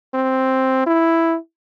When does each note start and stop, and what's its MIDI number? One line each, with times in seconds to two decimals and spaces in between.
0.14 0.85 60
0.86 1.36 64